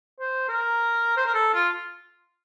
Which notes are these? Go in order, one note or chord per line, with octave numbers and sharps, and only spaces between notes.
C5
A#4
C5
A#4
A4
F4